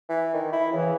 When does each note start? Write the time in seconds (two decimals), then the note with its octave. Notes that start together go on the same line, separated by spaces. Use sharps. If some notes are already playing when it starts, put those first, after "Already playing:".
0.10 E3
0.34 D#3
0.53 E4
0.73 C#3 E3